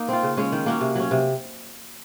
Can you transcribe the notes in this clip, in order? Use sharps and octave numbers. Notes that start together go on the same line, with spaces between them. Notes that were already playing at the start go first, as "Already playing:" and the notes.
Already playing: A#3 D#4
C4 F4
C#3
G#3 C#4
D#3
A#3 C#4 F#4
C3
F#3 C#4
C3